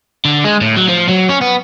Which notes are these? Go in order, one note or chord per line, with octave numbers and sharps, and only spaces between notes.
D3
G#3
A2
F#3
F3
F#3
C#4
B3